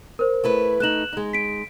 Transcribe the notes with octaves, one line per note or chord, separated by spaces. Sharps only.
A#4 C5
A3 E4 B4
A3 D#4 F#6 E7 F#7
G#3 D#4
B6 D7